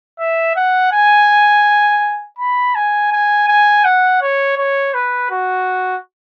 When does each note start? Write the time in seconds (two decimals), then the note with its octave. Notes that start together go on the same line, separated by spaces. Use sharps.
0.19 E5
0.56 F#5
0.92 G#5
2.38 B5
2.75 G#5
3.12 G#5
3.48 G#5
3.84 F#5
4.22 C#5
4.58 C#5
4.94 B4
5.31 F#4